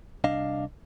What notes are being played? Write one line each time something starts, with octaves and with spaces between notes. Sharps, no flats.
C2 D4 D#5 F5